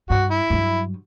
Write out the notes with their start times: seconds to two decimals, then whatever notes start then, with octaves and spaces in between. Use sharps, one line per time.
0.10 G2 F#4
0.31 E4
0.50 G2 F#3